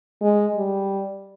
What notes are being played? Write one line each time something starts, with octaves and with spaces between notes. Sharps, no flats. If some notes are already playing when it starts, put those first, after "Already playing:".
G#3
G3